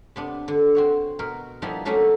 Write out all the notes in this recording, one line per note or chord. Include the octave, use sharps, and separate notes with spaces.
C3 B3 D4
D3
C4 F#4 C#5
B2 A#4
F3 G3 A#3 B3 D#4 E4
F#3 A3 A#3 C#4 D#4 F#4